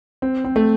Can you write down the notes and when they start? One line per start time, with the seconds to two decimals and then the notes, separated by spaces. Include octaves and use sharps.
0.22 C4
0.45 C4
0.56 A3